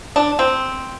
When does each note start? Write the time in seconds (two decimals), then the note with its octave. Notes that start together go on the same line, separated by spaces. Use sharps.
0.16 D4
0.39 C4